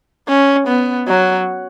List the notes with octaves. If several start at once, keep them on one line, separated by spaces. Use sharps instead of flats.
C#4
B3
F#3